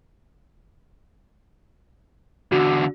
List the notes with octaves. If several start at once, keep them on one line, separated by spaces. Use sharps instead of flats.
E2 D3 F#4